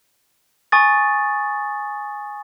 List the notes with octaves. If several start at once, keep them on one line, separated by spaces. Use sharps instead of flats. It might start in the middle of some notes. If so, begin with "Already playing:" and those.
G#5 C#6 D#6 A6